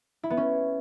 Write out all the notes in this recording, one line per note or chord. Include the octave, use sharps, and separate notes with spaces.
E4
B3
C#4